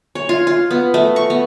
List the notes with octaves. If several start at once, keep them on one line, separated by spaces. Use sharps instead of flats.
C#5
F4
F4
B3
A3
C#6
B3